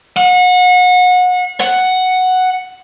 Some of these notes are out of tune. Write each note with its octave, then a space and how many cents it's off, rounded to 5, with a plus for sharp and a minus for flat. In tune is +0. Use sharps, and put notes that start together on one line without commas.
F#5 -30
F#5 +0